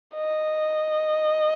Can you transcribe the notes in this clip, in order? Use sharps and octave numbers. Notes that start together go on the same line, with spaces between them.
D#5